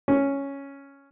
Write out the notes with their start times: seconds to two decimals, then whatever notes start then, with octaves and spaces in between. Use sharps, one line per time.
0.08 C#4